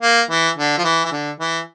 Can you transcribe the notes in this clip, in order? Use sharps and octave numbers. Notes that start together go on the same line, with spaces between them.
A#3
E3
D3
F3
E3
E3
D3
E3